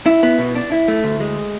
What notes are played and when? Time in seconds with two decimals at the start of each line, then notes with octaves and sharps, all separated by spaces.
0.06 E4
0.23 B3
0.39 B2
0.55 D4
0.72 E4
0.88 A3
1.04 D2
1.20 G#3